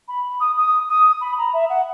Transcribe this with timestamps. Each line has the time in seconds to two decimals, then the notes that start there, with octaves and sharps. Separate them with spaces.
0.08 B5
0.40 D#6
0.57 D#6
0.89 D#6
1.21 B5
1.38 A#5
1.53 E5
1.70 F#5